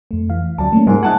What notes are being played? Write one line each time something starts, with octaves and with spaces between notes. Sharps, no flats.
F2 A3
E3 F5
D2 F#3 D5 A5
A3 A#3 C#4
G#2 G3 A#3 A#4
D#5 F#5 G#5 A5 F#6